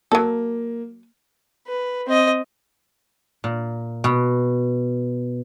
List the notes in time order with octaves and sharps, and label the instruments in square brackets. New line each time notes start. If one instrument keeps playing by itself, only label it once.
[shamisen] F#3 A4 [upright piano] A#3
[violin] B4
C4 D#5
[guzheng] A#2
B2